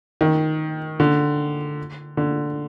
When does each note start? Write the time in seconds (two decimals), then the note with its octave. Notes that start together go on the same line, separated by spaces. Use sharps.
0.21 D#3
1.00 D3
2.17 D3